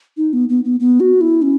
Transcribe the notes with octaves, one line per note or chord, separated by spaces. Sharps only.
D#4
B3
B3
B3
B3
F#4
E4
C#4